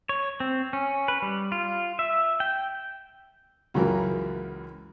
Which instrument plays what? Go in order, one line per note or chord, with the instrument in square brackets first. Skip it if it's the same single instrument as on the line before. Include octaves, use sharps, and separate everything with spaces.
[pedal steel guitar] C#5
C4
C#4
B4
G3
F4
E5
G5
[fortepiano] C#2 F#2 E3 F#3 A#4